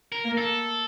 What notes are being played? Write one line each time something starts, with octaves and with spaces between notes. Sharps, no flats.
A#4
A#3
A4